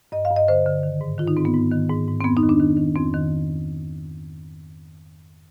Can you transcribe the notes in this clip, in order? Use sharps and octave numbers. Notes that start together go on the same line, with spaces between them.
G2 D#5
F5
G2
D#5
D3 C5
D3
D#3
G#2
D#3 F4
D#4
G#2 C4
B3
G#2
D#3
G#2
G#2
C4
F2 B3
D#4
D#3
D4
D#3
D#3
F2 C4
D#3